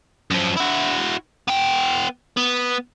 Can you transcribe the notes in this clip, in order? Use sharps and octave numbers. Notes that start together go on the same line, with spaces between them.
F#2 F3
E4 F#4
B3 G5
B3